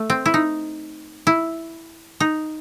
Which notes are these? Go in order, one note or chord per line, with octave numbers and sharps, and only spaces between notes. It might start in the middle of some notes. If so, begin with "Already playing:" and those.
Already playing: A3
C4
E4
D#4
E4
D#4